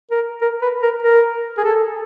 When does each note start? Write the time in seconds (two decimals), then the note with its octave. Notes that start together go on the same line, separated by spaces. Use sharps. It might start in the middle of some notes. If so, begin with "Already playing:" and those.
0.11 A#4
0.41 A#4
0.62 B4
0.82 A#4
1.03 A#4
1.58 G#4
1.64 A4